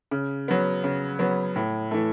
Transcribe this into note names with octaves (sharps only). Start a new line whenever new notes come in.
C#3
F#3 B3
C#3
F#3 B3
A2
E3 A3